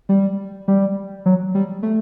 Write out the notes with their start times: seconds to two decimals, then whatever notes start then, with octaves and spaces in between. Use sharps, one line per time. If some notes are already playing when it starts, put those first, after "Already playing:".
0.09 G3
0.68 G3
1.26 F#3
1.55 G3
1.83 A3